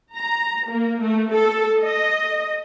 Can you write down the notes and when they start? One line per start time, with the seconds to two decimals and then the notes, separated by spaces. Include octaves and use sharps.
0.15 A#5
0.67 A#3
1.02 A3
1.33 A4
1.82 D#5